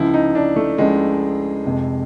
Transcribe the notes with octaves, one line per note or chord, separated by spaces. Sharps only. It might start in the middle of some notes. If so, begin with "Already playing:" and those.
Already playing: C#2 C#3 F3 E4
D#4
D4
A3
C#2 C#3 F3 G#3
F1 F2 C3